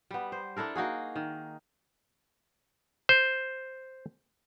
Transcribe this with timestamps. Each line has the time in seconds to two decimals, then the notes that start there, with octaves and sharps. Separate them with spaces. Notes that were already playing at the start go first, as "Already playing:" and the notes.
0.11 G3 B3
0.32 C5
0.57 D4 E4 A4 A#4
0.76 A#3 D#4 F#4 G#4
1.16 D#3
3.09 C5